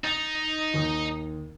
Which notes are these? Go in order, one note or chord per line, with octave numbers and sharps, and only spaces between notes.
D#4 A6
D#2 D#6